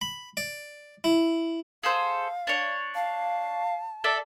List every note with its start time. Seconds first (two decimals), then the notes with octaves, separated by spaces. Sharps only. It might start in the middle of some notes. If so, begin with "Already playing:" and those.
0.01 B5
0.37 D5
1.04 E4
1.83 G#4 A4 C5 F5
2.47 D4 C#5
2.95 F5 A5
4.04 A4 D5 E5